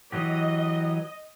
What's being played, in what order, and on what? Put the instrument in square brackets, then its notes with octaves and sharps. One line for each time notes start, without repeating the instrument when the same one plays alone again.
[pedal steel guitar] E3 F#3 G4 [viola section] D#5